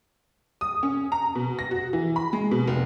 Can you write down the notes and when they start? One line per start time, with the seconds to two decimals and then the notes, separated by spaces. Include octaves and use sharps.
0.61 D#6
0.83 C#4
1.12 A#5
1.35 B2
1.59 A#6
1.71 F#4
1.93 E3
2.16 B5
2.33 G#3
2.51 B2
2.67 F1